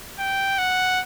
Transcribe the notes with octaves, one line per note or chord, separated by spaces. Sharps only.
G5
F#5